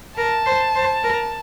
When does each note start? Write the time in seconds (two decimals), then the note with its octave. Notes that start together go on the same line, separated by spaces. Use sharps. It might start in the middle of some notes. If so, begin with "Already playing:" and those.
0.17 A#4 A5
0.46 C5
0.75 C5
1.04 A#4